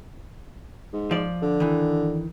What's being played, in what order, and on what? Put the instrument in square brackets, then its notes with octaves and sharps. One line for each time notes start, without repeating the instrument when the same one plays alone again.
[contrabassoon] G#2
[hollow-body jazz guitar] F3 D5
[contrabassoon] D3
[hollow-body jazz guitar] D#3 E3